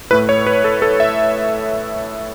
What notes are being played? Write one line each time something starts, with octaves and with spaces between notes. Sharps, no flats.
A2 A3 E4 B4
C#5
B4
A4
A4
E5